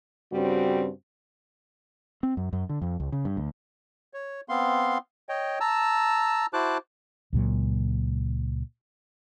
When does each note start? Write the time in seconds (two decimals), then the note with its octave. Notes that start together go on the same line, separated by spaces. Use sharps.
0.32 G2 C#3 G3 C4 F#4
2.23 C4
2.37 F#2
2.53 F#2
2.69 D3
2.82 F2
3.00 C#2
3.12 C#3
3.25 G2
3.37 D2
4.14 C#5
4.49 B3 C4 F5 C6
5.29 C#5 D#5 G5
5.60 A5 A#5 E6
6.53 E4 F#4 C5 A5 D6 F#6
7.33 C#2 A#2 F#3